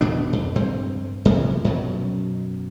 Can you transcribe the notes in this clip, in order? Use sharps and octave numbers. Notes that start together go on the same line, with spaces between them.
E2 B2 B3 D4
F2
G2 C4
F#2 C3 E3 F3
F#2 B2 F#3